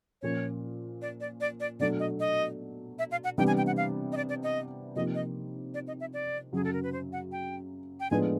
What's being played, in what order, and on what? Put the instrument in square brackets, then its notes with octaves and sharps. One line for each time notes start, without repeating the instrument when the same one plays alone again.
[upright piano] A#2 F3 A#3 C#4 [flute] C#5
[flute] D5
D5
D5
D5
[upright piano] B2 F#3 A3 D4 [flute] D5
[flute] D#5
D#5
E5
F5
F#5
[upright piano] C3 E3 G3 B3 D4 [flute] G5
[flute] G#5
G5
F#5
F5
D#5
D5
D5
D#5
[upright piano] C3 F3 A#3 D#4 G4 [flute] D#5
[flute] D#5
D5
D#5
E5
D5
[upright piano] F#2 C#3 F#3 [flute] G#4
[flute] A4
A#4
B4
C5
F#5
G5
G5
[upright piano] A2 F3 G#3 B3 D4 [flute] G#5